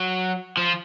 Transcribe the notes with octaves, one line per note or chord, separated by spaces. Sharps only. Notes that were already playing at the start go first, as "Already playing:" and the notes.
Already playing: F#3
F3